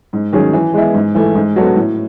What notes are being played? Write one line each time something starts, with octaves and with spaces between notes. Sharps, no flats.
G#2
D#3 F#3 C#4 G#4
E3
G#3 B3 E4
G#2
E3 A3
G#2
F#3 B3 F#4 A4
A2